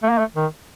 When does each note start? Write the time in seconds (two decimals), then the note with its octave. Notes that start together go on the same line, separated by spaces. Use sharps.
0.03 A3
0.10 A#3
0.18 A3
0.36 D#3